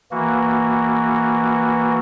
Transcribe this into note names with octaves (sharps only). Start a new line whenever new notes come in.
E3 A#3 F#4